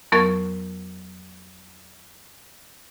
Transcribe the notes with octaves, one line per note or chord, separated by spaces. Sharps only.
F2 F#3 B3 A#4 C#6 A6